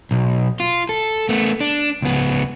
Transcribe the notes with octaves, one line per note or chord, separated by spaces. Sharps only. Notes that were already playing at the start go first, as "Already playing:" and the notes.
B1
F4
A4
A3 B3
D4
C#2 B3